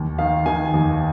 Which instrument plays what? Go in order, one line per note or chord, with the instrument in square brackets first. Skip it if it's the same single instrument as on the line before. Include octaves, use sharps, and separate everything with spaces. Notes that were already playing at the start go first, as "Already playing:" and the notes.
Already playing: [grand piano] D#2
D#3 F5
D#3 G#5
D#2